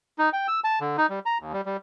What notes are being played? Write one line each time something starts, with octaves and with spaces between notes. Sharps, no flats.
D#4
G5
E6
A5
D3
D#4
G3
A#5
D#2
G3
G3